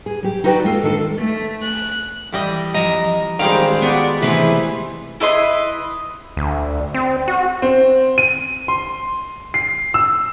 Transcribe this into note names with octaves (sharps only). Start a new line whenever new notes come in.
G#4
F#3 G4
D#4 E4 F#4 B4 D5 G5
G#3 A#3 F4 A4
D#3 D4 A4
A3
F#6
E3 G3 D#5
F3 D#5 A#5
A1 D#3 G3 G#3 C4 C5 D5 F5
B3 F#4 D5
C3 E3 A3 E4 G#4 B4 C5
E4 B4 D#5 C6
D2
C4
F#4
C4
D#7
C6
C7
E6